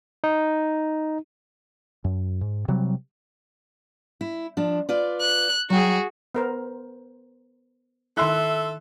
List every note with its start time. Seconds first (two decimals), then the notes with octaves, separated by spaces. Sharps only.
0.24 D#4
2.04 F#2
2.41 G#2
2.68 C3 F#3 G3
4.21 E4
4.57 F3 D4
4.89 F4 B4 D5
5.21 F#6
5.70 F#3 F#4 G#4 G5
6.35 B3 A#4 C5
8.17 D#3 E4 A4 E5 C6 E6 F#6